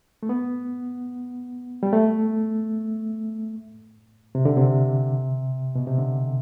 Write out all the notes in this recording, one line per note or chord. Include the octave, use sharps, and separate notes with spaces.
A3
B3
G3
A3
C3
D3
C3
B2
C3
D3